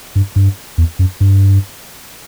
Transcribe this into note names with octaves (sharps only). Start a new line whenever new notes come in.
G2
G2
E2
F#2
G2